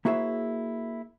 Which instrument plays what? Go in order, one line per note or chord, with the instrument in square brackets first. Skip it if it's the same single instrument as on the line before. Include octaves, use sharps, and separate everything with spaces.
[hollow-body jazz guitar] A#3 E4 F#4 G#4 C5 E5